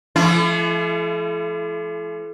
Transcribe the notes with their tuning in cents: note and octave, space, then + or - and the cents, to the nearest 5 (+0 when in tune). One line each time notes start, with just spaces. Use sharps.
F3 -45 A3 -35 E4 +40